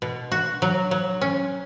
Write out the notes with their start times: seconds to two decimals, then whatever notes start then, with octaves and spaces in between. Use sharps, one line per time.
0.02 B2
0.32 F#4
0.62 F#3
0.91 F#3
1.21 C#4